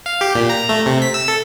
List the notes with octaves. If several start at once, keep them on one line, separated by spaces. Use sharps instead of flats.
F5
G4
A#2
A#5
A3
C3
B6
E6
A4